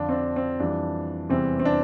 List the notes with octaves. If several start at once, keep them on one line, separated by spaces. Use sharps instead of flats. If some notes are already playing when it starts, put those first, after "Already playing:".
Already playing: F2 D3 F3 D4
C4
D4
C4
F2 E3 G3 D4
E2 C3 E3 G3 C4
C4
D4